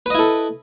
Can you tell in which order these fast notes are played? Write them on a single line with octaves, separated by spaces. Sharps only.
B4 D#5 E4 A4